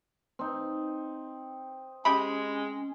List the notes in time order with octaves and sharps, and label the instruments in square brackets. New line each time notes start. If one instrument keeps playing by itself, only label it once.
[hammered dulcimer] C4 D#4
[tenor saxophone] G#3 [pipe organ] C#4 [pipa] G4 B5